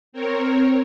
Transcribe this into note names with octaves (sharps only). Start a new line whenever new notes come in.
C4 A#4 C#5